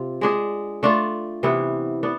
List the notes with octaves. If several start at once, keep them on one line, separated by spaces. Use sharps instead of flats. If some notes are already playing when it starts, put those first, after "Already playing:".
Already playing: C3 F4
G#3 D4 G#4
A3 D4 F4
C3 E3 B3 E4
B3 D4